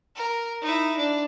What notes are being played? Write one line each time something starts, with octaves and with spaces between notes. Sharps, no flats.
A#4
D#4 E4
D4